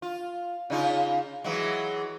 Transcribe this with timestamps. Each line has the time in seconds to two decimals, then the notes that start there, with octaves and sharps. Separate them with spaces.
0.02 F4
0.70 C#3 D#4 F4
1.44 E3 F#3 G#3